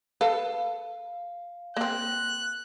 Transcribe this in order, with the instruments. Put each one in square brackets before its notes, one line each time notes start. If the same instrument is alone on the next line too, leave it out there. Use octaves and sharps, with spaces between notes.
[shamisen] A4 B4 [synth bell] F5
[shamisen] A#3 C4 [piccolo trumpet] F#6